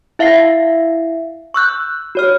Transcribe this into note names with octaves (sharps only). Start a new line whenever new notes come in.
E4 E5 F5 A#6 C7
C#6 E6 F#6 G6
F#4 C#5 F6